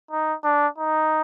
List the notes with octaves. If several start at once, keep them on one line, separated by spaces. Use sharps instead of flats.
D#4
D4
D#4